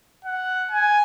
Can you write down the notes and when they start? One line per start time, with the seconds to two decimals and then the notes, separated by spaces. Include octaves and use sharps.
0.25 F#5
0.71 G#5